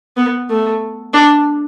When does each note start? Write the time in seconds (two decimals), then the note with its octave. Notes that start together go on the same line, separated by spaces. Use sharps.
0.17 B3
0.50 A3
1.14 D4